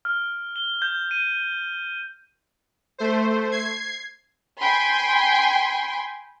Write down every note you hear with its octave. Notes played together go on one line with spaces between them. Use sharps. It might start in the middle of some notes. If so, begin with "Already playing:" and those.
F6
G7
G6
D#7
A3 C5
G#6 C7
G5 G#5 B5 C6